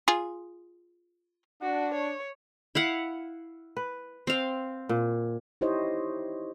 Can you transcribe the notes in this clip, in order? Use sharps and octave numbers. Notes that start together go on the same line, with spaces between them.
F4 G#4
D4 F#4
C#5
E4 F5 F#5
B4
C4 F5
A#2
D#4 E4 G4 C5 C#5 D#5